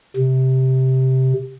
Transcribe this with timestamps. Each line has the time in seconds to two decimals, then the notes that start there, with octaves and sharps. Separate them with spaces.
0.17 C3